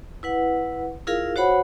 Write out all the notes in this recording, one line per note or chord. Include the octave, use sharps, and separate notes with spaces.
E4 B4 F#5
E4 F4 G#4 A#4 F5
F#4 C5 C#5 F#5 B5